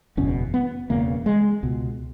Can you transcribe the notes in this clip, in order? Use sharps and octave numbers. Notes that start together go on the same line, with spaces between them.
F#1 E2 B2 C#4
B3
E1 E2 C#3 A#3
G#3
C#2 B2